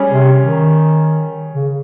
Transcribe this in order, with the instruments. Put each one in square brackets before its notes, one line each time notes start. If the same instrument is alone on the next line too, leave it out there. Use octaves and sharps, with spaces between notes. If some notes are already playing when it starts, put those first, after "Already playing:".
Already playing: [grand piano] G3 C#4 G#4 C#5
[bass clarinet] C3
D#3
C#3